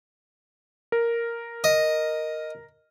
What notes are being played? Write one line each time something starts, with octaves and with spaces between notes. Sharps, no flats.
A#4
D#5